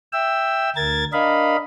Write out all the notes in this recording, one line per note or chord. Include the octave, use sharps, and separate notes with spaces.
E5 G5 E6
D2 A#4 G#6 A6
D4 A#4 D#5 F5 B5